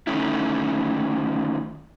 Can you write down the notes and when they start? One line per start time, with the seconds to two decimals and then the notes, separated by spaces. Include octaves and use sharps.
0.07 D3 D#3 A3 C#4 E4